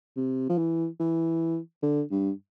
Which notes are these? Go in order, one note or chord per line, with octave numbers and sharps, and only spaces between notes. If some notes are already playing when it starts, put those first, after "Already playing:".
C3
F3
E3
E3
D3
G2